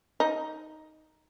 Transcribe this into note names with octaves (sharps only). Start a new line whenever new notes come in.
D#4